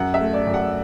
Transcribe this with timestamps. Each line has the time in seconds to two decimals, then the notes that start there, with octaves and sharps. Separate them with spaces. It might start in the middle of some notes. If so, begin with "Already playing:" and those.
Already playing: F#2 F#5
0.14 E5
0.21 A3
0.33 D5
0.47 F#2
0.54 F#5